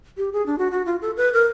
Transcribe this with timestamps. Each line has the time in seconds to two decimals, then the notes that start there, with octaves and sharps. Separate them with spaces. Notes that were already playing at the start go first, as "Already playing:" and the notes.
0.17 G4
0.33 G#4
0.46 D4
0.58 F#4
0.71 F#4
0.86 F4
1.02 A4
1.17 B4
1.34 A#4